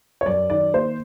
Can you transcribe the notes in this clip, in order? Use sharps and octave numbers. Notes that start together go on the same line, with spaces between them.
C#5
F#2 D5
D#3 D5
A#3 C5